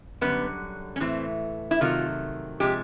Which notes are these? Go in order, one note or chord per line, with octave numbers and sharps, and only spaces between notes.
F#2 D3 G3 B3
C#4
A2 E3 A3 C4
E4
C3 D#3 F#3 A3 F4
C3 F3 G#3 G4